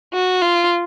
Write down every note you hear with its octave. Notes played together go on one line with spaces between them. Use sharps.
F#4
F4